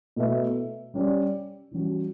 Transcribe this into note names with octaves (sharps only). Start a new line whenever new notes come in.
B2 A3 E4 B4 E5
G3 C#4 G4 D5
E3 G3 C#4 F#4